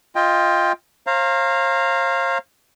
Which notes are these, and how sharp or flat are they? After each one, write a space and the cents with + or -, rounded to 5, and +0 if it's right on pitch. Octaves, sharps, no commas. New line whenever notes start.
F4 +0 D#5 +20 G5 +15
C5 +45 F5 -10 A#5 -10